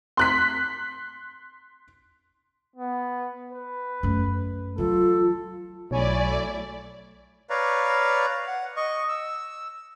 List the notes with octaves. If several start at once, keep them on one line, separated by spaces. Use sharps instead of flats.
C6 F#6 B6
B3
B4
F#2 A3
E3 F#3 F4 A4
B1 F#3 A3 E4 C#5 D5 G#5 B5
B4 C#5 D5 F5 A#5
F#5
D#5 C#6
E6